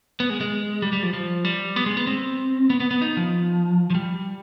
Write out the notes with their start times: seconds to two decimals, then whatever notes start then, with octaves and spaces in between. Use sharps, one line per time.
0.20 B3
0.30 G#3
0.41 G#3
0.82 G3
0.93 G3
1.03 F3
1.13 F3
1.45 G3
1.76 B3
1.86 G#3
1.97 B3
2.07 C4
2.70 B3
2.80 B3
2.91 B3
3.02 D#4
3.17 F3
3.90 F3
3.95 G3